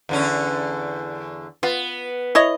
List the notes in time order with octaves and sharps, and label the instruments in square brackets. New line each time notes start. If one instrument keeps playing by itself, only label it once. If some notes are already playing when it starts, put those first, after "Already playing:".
[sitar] E2 D3 C#4
[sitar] B3 [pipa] F4
[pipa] E4 C#5 D#5